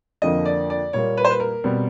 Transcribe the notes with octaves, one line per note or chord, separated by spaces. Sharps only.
F2 D3 F3 A#3 D#5
D5
D5
A#2 G3 A#3 C#5
B4
C5
B4
A#4
B2 G3 C4